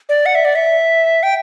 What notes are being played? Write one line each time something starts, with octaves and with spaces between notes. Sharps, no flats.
D5
F#5
E5
D5
E5
G5